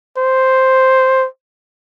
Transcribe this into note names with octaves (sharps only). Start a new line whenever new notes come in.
C5